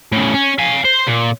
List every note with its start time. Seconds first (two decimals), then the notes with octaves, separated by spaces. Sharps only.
0.12 A2 C#3
0.34 C#4
0.59 F5 G#5
0.85 C5
1.07 A#2